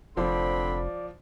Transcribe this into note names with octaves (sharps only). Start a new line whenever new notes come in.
F1 D3 F3 C4 D5 B5